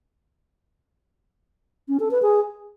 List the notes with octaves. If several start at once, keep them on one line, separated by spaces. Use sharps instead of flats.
C#4
A4
B4
G#4